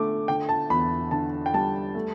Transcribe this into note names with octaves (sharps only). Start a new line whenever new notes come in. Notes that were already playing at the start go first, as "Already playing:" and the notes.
Already playing: D3 A3 D6
D3 G5
A5
E2 B5
D3 A5
G5
G3 A5
A3